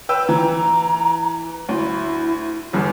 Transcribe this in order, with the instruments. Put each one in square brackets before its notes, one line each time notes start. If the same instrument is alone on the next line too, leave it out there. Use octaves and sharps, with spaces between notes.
[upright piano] B4 G5 E6
[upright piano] E3 [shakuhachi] A#5
[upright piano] D2 [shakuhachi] E4
[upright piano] G1 E2 G2